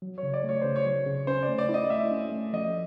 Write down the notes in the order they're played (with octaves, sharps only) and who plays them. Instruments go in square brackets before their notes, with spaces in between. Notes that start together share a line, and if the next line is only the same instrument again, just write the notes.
[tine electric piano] F#3
[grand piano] C#5
[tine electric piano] C#3
[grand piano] D5
[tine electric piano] A3 [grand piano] C#5
[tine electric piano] C#3 [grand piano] C5
[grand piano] C#5
[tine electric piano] F#3
C#3
[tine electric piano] C#4 [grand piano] C5
[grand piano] D5
[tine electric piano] A3
[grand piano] D5
[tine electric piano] E4
[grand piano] D#5
[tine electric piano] A3 [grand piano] E5
[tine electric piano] C#4
A3
[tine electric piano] F3 [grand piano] D#5